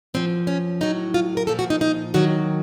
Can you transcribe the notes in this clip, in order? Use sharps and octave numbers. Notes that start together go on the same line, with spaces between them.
F#2 F3 C4
C#4
A2 F#3 D#4
F4
A#4
A#2 F3 A4
F#4
D#4
D#4
D#2 D#3 F#3 F#4